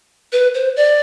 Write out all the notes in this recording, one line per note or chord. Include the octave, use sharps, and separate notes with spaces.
B4
C5
D5